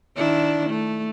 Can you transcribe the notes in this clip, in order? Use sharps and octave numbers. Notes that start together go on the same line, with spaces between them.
D#3 D4 E4
A3